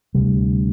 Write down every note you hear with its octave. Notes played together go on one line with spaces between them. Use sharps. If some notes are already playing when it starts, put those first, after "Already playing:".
D2 C3 G3